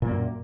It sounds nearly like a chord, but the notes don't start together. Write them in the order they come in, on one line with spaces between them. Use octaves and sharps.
A#2 A#3 F#2